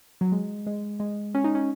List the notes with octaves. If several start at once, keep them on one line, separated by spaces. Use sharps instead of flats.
F#3
G#3
G#3
G#3
C#4
D#4
C#4